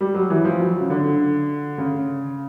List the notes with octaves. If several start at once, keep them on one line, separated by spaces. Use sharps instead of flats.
G3
F#3
E3
F3
F#3
C#3
D3
C#3